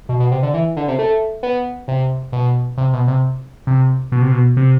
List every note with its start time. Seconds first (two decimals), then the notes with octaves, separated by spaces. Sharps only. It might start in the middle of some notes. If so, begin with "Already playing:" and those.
0.09 B2
0.20 B2
0.31 C3
0.43 D3
0.54 E3
0.76 D3
0.88 C3
0.99 A3
1.43 B3
1.88 C3
2.32 B2
2.77 C3
2.93 B2
3.08 C3
3.67 C3
4.12 B2
4.22 C3
4.32 B2
4.57 C3